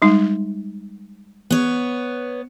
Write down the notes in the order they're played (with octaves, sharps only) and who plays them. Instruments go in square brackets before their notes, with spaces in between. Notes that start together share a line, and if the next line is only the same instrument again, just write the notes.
[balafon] G3 G#3 D#4
[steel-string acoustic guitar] B3 C#5